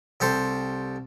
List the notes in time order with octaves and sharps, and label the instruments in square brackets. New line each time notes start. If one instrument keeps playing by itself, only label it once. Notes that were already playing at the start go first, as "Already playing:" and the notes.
[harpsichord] C2 G4 A4 C5